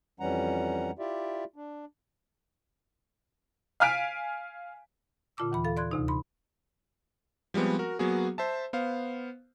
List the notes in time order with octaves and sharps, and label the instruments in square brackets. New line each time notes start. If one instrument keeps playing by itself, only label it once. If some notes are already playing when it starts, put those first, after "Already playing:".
[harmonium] F2 E3 G3 C#4 F#5 A#5
E4 F4 G4 D5 E5
D4
[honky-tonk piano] F5 G#5 F6 B6 D7
[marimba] A#2 D3 F4 A5 D6 E6
D#2 E3 B5
A4 F5 B5
D5 C6 F#6 G#6
D2 C3 D#4
B5 C6
[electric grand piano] F3 G3 G#3 B3 C4
F#4 A#4
F#3 A#3 B3 F#4 G#4
C5 E5 A5
B3 C5 F5